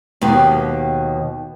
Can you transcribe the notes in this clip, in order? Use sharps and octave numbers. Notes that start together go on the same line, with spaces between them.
D#2 B2 G4